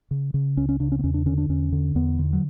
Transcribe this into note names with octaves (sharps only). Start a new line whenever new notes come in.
C#3
C#3
C#2 C#4
C#4
C#3 D4
C#4
B3
E2 C#4
D4
D3 C#4
D4
E2 C#4
D3
E2 B3
D3
F#3